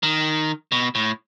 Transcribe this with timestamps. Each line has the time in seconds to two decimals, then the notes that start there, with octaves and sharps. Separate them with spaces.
0.03 D#3
0.72 B2
0.95 A2